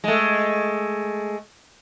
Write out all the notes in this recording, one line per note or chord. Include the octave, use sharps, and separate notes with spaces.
G#3 A3